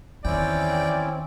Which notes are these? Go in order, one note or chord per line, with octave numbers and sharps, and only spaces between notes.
E2 D#3 C4 C#4 E4 D5 G5